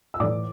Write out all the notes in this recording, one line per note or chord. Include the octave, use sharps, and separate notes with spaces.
E6
A2 E3 D5 D6